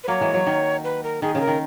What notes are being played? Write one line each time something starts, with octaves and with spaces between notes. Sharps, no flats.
B4
F#3 A#3 C#5
E3 G#3
F#3
D#3
B4
A#4
D#3 G#4
C#3 G#4
A#4
D#3